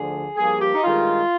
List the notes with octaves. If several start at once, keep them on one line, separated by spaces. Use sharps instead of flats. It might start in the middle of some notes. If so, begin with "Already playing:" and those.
Already playing: D2 D3 F3 G#4
G2 F3 A#3 G#4
G4
D#4
G2 D#3 G#3 F4